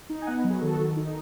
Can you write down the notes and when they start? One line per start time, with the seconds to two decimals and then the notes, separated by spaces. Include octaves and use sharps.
0.10 D#4
0.22 G#5
0.27 B3 D#5 F#5
0.38 B4 D#5
0.44 F#3
0.50 G#4 B4
0.61 D#3 F#4 A4
0.79 D#3
0.96 D#4